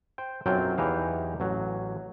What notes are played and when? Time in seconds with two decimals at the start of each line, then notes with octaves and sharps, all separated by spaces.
0.18 C5 G5
0.46 B1 F#2 F#3 C4 F4 G5
0.78 E2 E3 D#4 G4 F5
1.40 A1 F#3